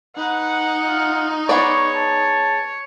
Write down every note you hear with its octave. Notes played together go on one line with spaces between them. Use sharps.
D#4 B4 F#5
F4
G#3 B3 C#5 D5 C#6
A5